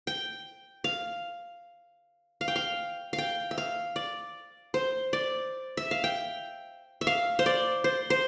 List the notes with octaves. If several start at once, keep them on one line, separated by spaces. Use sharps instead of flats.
G5
F5
F5
G5
F5
F5
G5
E5
F5
D5
C5
D5
E5
F5
G5
E5
F5
C5
D5
C5
C5